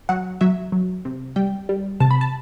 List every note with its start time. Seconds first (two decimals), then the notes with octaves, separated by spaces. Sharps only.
0.09 F#3 F#5
0.41 F#3 E5
0.72 F#3
1.05 C3
1.36 G3 G5
1.69 G3
2.00 C3 A5
2.11 B5
2.21 A5